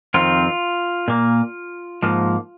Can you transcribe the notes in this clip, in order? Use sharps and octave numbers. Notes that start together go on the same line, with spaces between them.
F2 D#3 C4 F4
A#2 A#3
G#2 F3 A#3